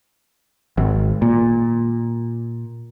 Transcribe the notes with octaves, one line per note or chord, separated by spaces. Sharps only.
G#1
A#2